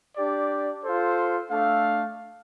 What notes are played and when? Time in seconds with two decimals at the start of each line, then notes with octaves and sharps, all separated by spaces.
0.16 D4 G4 D5
0.83 F4 A4 C5
1.50 A3 D4 A4 F5